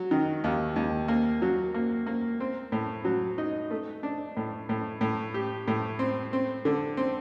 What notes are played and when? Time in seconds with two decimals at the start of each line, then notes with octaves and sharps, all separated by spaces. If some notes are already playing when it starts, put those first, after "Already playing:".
Already playing: F#3
0.11 D#3
0.44 D#2
0.76 D#2
1.08 A#3
1.42 F#3
1.74 A#3
2.06 A#3
2.40 C4
2.72 A2
3.05 F#3
3.38 D#4
3.71 A3
4.03 D4
4.37 A2
4.69 A2
5.01 A2
5.34 G4
5.68 A2
5.99 C4
6.33 C4
6.65 D3
6.97 C4